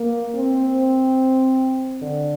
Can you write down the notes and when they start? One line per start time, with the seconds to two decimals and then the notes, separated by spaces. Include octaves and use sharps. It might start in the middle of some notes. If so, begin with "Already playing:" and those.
Already playing: A#3
0.36 C4
2.02 D3